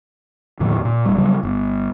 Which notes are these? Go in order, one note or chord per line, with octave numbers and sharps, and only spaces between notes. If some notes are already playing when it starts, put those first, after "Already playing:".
D#2 A2 D3 F3
A#2
D#1 G3
C#3 F#3 G3
G1